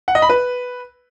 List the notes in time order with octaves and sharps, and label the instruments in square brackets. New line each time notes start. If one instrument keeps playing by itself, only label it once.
[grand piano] F#5
D#5
B5
B4